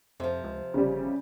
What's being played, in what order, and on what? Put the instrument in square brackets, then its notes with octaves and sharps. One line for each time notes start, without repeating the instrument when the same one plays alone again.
[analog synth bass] F2 [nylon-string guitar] C3 F3
[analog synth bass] C#2
[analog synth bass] G1 [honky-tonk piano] C#3 G3